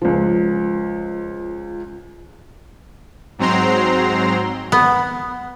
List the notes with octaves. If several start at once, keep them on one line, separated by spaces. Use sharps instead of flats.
C#2 F3
G#2 F#3 C4 A#5 C6
B3